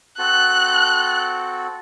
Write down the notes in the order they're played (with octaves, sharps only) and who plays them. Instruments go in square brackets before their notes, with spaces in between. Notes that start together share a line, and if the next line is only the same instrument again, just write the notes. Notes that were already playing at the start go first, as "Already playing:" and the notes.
[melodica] C4 F#4 A4 [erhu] F#6